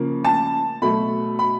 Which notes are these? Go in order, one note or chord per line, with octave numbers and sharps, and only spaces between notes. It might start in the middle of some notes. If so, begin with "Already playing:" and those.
Already playing: C#3 F3 A#3
A5
B2 F#3 A3 B5
B5